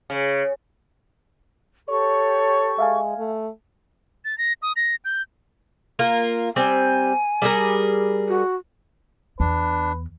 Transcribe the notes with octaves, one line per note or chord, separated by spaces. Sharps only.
C#3
G4 A4 C#5 C#6
G#3 E5 F5 G#5
A3
A6
A#6
D#6
A#6
G6
A#3 F4 A#4
G3 C4 G#5
G3 G#4 A#4
F#4
E2 D4 B4